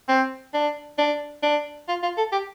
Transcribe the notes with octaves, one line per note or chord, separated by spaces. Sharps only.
C4
D4
D4
D4
F4
F4
A4
G4